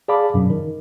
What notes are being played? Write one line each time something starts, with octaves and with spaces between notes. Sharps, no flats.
G#4 D5 F5 A5 B5 D6
F#2 B2
D#3